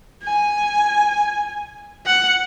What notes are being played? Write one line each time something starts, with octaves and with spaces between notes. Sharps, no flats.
G#5
F#5